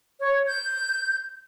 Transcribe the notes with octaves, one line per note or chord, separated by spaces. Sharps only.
C#5
G6